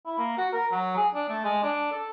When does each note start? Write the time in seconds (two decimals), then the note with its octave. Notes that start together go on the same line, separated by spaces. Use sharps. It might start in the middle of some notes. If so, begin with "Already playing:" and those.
0.06 E4
0.18 A#3
0.38 F#4
0.53 A#4
0.71 F#3
0.96 G#4
1.14 D4
1.29 A3
1.44 G#3
1.63 D4
1.92 A4